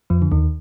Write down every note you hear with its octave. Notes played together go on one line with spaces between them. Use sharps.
F2 F3
D3
D#2 D#3